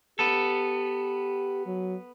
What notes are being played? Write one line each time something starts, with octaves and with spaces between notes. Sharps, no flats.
B3 G4 A4
F#3